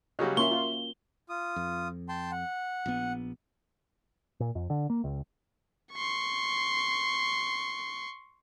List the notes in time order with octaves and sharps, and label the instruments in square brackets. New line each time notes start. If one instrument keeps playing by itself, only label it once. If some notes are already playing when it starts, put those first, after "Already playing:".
[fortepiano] C#3 F#3 G3 [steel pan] F#4 D#5
[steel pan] A#3 C#4 F4 [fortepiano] E5 C6 C#6 [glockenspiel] G7
[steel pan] F4
[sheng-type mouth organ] F4 D#6
[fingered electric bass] F2
[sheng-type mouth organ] G5 A5 C6
F#5
[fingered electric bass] A#1 B3
[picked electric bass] A#2
F2
D3
A#3
C#2
[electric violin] C6 C#6